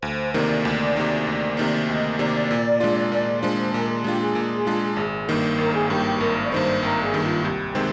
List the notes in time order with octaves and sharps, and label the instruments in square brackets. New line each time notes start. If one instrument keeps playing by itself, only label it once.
[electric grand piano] D2 [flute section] C5
[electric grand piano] C3 D#3 A#3 [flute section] D5
[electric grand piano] D2
C3 D#3 A#3
D2
C3 D#3 A#3
[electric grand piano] D2 [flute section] D#5
[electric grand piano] C3 D#3 A#3 [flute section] D5
[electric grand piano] A#2
G#3 D4 F4
[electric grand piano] A#2 [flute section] D5
[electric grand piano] G#3 D4 F4 [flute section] C5
[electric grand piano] A#2 [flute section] A#4
[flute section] A#4
[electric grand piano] G#3 D4 F4 [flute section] G4
[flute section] G#4
[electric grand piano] A#2
G#3 D4 F4
G#1
G2 D#3 A#3
[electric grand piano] G#1 [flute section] A#4
[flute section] G#4
[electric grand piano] G2 D#3 A#3 [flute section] G4
[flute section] G4
[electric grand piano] G#1 [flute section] A#4
[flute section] D5
[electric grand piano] G2 D#3 A#3 [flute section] C5
[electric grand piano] G#1 [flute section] A#4
[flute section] G#4
[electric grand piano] G2 D#3 A#3
[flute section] F4
[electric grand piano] C2 [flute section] G4
[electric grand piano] C3 D#3 G#3 C4